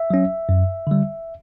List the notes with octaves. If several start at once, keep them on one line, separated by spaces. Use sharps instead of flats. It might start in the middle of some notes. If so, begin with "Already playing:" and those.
Already playing: E5
F#3 C#4
F#2
D3 G3